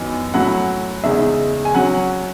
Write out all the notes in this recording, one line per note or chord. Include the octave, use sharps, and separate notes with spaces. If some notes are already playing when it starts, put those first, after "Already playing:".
Already playing: F#2 E3 B3 D#4
A2 F#3 C#4 E4 F#5
E2 C#3 G#3 D#4 E5
G#5
F#3 C#4 F#5